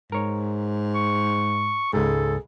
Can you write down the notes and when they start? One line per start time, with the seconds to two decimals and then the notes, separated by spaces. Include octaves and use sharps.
0.12 G#2 A#4 C#5
0.95 C#6
1.93 C#2 G#2 G#4 A4